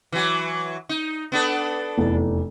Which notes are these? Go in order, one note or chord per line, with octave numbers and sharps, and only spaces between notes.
E3 F#3
D#4
B3 D4 A4
F1 E2